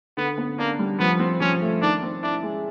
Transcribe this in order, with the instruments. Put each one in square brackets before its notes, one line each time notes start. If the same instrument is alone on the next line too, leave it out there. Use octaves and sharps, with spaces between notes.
[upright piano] D3 [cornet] B3
[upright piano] B3
[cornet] A#3 [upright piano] D4
[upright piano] G3
[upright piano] F3 [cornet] B3
[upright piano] C4
[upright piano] F3 [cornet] C#4
[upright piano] A3
[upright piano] D#3 [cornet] D4
[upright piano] C4
[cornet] D4 [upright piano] E4
[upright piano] G#3